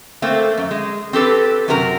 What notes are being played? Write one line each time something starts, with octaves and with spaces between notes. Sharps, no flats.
A3 A#3 C4
F#2
G#3
C4 G4 A4 B4
F#2 C3 F#4 A#4 A#5